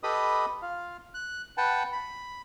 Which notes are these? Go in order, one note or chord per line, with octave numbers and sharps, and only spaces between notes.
G4 A4 B4 D#5 B5 D#6
F4 F5
F#6
B4 F#5 G5 A5
B5